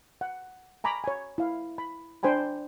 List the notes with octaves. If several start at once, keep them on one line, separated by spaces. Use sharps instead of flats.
F#5
G#5 A#5 B5 C#6 D6
C#5 G#5
E4 F5
B5
D4 C5 G5 G#5 B5